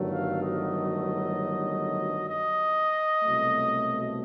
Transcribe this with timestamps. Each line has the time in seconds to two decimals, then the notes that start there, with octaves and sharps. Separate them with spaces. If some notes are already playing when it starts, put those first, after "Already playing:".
Already playing: G1 G2 D#3 F#3 A3
0.12 F5
0.43 D#5
2.29 D#5
3.21 C2 B2 F#3 A3